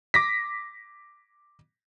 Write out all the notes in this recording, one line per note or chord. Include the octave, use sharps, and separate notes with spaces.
D6 A#6 B6